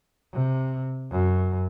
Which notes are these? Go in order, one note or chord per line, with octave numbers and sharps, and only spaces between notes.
C3
F#2